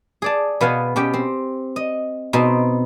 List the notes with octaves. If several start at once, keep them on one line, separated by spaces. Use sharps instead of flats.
G#4 D5 A5
B2 B3 F5 F#5 G#5
B2 C#4 G4 G5
C4
D#5
B2 C4 D#4